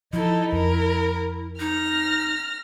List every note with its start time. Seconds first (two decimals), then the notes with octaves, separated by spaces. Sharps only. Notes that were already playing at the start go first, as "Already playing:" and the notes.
0.13 F3 D#4 E4 A4
0.52 F2 A#4
1.60 D#4 F6 A#6